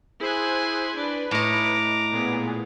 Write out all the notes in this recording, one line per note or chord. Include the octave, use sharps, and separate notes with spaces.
E4 G#4 C5 G#5 F#6
D4 B4
A2 D#5 A#5 D6
A#2 B3 G#4